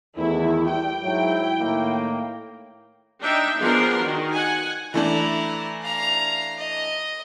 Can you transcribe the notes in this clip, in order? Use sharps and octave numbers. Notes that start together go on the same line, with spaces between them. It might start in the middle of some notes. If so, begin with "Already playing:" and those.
E2 D#3 A3 E4
G3 G5
G#2 F#3 E4
A2 D#3 A#3
D4 D#4 E5 G5
F3 B3 D4 G#4 A#4 C6
D#3 F#4
F#5 G#5
E3 A3 D4 E4 A#5
F5 A#5
D#5